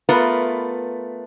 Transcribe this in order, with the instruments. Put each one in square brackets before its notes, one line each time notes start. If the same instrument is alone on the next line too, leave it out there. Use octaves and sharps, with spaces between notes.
[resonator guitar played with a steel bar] A3 B3 F4 A#4 B4